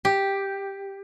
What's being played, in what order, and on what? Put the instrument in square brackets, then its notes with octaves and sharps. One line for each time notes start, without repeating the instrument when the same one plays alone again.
[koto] G4